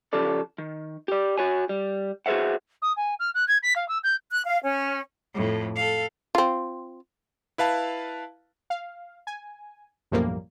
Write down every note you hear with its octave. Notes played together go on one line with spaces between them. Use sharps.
C#3 F3 G4 A4 D5
D#3
G4 D5
F#4 C#5 G#5
G3
F#4 G#4 B4 C5 E5 F#5
D#6
G#5
F6
F#6
G#6
B6
F5
E6
G6
F#6
F5
C#4
F2 A2
A4 F5
C4 F4
E4 B4 F5 A5
F5
G#5
B1 F#2 A2 F3 G3 A#3